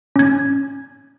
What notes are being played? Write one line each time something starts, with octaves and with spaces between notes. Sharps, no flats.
C#4 G#6